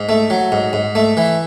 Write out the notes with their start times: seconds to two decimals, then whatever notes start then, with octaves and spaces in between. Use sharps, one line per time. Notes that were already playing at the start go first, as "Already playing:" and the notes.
Already playing: G#2
0.09 A3
0.30 F#3
0.52 G#2
0.73 G#2
0.95 A3
1.17 E3